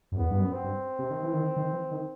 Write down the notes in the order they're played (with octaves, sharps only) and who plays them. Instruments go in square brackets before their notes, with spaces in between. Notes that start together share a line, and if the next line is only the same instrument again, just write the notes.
[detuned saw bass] F#2
[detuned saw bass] E2 [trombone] B3
[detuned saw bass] G2
F#2
[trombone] C4
[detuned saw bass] G2
C3
D#3
E3
D#3
D#3
E3
D#3